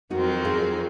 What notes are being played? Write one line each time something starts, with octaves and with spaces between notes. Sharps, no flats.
F2 D#3 F#3 C4 D#4 F#4
F4 G#4